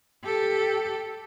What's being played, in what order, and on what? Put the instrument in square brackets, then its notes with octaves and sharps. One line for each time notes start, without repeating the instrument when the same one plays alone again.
[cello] G4 A4